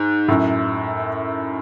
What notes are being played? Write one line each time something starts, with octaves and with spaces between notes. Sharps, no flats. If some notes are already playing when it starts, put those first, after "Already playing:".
Already playing: G#2
F#2 A2